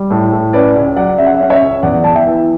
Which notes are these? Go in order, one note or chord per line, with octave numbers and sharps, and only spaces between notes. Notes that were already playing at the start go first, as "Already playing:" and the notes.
Already playing: G3
A2
A2
C#4 B4 D5
C#2
F#3 D5 F#5
C#3 E5
F#5
E5
C#4 F#5
C#5 E5
C#2
E2 D5 F#5
E2 A5
E5 G5
E3